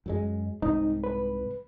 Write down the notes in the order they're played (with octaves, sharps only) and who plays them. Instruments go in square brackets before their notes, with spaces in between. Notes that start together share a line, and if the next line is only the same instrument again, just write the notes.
[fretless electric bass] F#2 F#3 G#3
[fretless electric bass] C2 G#2 C4 [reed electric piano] D#4
[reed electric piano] B4